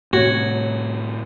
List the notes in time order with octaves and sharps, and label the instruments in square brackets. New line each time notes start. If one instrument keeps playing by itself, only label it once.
[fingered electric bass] A2 C3 [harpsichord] F#4 [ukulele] C#5